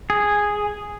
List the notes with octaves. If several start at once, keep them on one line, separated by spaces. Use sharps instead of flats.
G#4